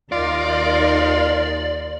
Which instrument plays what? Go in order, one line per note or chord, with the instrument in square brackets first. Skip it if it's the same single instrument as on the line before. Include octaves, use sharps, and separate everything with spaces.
[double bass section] D#2 [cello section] D#4 A#4 [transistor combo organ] F4 C6 [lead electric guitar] D5